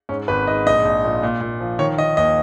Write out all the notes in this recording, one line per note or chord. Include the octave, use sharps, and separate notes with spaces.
G#2 C#4
G#1 B4
G#2 D#5
A#1 D#5
A#1
A#2
A#2
A#2
F3
D#3 C#5
D#3 D#5
D#2 D#5